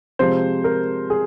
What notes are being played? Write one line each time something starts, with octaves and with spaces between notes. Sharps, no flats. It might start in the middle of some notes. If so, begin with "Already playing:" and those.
C3 F3 G#3 C5
A#4
G#4